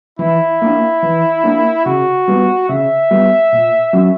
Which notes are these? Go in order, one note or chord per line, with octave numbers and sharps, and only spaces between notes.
E3 E4
A#3 D4
E3
A#3 D4
C#3 F#4
G3 B3
C#3 E5
G3 B3
A#2
F#3 C#4